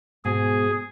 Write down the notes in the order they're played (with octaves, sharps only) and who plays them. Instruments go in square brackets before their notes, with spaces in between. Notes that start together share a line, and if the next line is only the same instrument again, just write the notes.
[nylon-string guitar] G#2 B2 [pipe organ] G#4